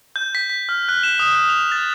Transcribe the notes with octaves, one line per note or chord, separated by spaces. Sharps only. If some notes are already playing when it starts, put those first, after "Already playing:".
G6
B6
B6
F6
F#6
E7
D#6
F#6
F7
A6